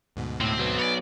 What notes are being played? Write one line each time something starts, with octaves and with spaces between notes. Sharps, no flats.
D2 G#2 B2
A2 C4
F#3 B3
B4 C#5 D5 G#5